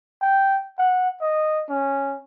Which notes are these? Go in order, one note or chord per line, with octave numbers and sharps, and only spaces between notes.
G5
F#5
D#5
C#4